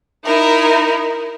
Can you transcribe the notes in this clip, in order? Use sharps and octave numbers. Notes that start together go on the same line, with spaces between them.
D#4 E4 A#4